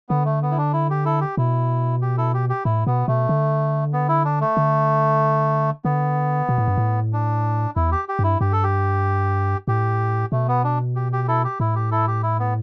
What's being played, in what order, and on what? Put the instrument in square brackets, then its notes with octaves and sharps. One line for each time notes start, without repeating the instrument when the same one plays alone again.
[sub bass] D3 [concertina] B3
[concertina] A3
B3
E4
D4
E4
G4
E4 A4
G4
[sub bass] B2 [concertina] E4
[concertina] G4
E4 A4
G4
G4
[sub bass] A2 [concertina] E4
[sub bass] B2 [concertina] B3
[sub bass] B2 [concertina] A3
[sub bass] D3
[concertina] B3
E4
D4
A3
[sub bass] D3
[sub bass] D3 [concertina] B3
[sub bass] B2
A2
G2
A2
[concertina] D4
[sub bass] E2 [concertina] E4
[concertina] G4
G4
[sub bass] G2 [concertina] E4
[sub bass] G2 [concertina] G4
[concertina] A4
G4
[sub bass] A2 [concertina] G4
[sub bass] B2 [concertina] A3
[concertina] B3
D4
G4
G4
E4 A4
G4
[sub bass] A2 [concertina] E4
[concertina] G4
E4 A4
G4
E4
B3